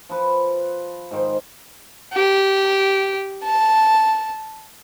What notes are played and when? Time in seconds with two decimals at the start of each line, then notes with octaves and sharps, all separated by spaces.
0.09 F3 B4
1.11 G#2 D#3 C5
2.13 G4
3.44 A5